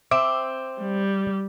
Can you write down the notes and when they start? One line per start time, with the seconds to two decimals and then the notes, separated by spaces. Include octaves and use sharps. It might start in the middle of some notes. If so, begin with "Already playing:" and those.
0.11 C4 E5 D6
0.80 G3